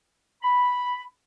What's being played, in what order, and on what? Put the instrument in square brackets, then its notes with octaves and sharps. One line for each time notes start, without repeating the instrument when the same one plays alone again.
[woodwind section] B5